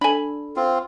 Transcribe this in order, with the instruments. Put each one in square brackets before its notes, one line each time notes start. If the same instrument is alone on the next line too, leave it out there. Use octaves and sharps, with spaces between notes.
[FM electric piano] D4 A4 [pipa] G#5 B5
[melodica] C4 F4